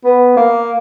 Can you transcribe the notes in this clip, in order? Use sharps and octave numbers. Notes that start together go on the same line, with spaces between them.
B3
A#3